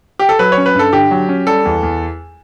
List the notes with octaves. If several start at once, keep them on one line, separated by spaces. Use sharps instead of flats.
G4
A4
F#3 B4
C#5
C#4
B4
G2
A4
D3 G4
F#3
C#4
G3 A4
E2
E2